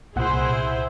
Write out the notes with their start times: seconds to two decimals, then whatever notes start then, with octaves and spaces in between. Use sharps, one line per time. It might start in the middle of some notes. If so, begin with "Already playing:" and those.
0.16 C2 A#2 E4 G#4 C5 F#5